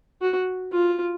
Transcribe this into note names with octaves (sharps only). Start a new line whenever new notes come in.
F#4
F4